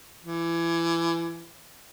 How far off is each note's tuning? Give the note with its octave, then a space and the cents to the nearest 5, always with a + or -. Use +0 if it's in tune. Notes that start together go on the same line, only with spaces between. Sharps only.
E3 +25